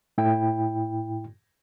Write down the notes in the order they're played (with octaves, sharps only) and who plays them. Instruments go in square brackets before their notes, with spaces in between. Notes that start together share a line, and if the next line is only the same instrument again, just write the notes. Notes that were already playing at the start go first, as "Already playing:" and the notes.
[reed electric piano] A2 E4 G5